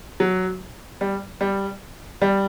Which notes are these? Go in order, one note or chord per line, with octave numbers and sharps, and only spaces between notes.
F#3
G3
G3
G3